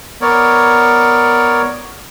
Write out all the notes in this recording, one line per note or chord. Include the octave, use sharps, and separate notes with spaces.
B3 A#4 C#5 D5